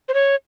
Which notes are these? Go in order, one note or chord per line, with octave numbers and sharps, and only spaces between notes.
C5
C#5